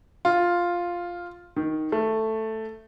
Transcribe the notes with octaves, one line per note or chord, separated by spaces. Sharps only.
F4
D#3
A3